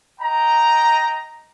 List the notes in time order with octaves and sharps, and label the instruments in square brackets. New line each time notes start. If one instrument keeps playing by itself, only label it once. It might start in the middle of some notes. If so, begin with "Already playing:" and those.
[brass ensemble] D#5 G5 A#5